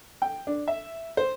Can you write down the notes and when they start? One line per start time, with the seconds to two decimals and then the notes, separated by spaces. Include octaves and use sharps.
0.22 G5
0.47 D4
0.68 E5
1.17 C5